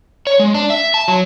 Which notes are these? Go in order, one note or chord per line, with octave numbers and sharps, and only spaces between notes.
C#5
G#3
D4
E5
A5
F#3